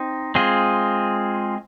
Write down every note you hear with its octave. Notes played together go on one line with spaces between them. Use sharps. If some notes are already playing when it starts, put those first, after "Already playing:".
Already playing: C4 D#4
G#3 C4 F4 G#4